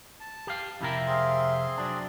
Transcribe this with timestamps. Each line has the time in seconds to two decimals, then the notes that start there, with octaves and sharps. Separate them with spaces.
0.20 A5
0.47 G4 F5
0.81 F2 C3 E4 G4 A#4 E5 F5 A5
1.07 C4 G#4 C6
1.78 F#3 D4 D5